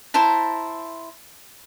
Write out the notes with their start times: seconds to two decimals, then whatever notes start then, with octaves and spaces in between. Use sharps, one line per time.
0.14 E4 C5 A5 A#5